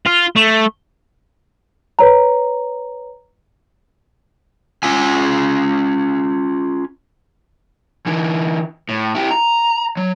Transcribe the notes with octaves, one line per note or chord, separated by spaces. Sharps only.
F4
A3
B4 C#5 A#5
C#4 F4 G#5
D3 E3
A2
E4 G4
A#5
F#3